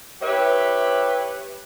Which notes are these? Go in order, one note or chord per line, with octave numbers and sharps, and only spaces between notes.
E4 G4 B4 C#5 E5